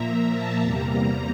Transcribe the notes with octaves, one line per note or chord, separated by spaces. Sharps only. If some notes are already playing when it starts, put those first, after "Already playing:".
Already playing: A#2 F3 A#3 E5 A#5
A5
E2 C3 G3 A#3 A#5